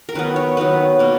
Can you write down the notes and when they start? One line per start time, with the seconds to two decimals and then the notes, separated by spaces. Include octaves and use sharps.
0.09 A#4
0.15 D#3 F#3 B3 B4
0.36 C#5
0.57 D#3 F#3 B3 B4
0.99 B2 A#3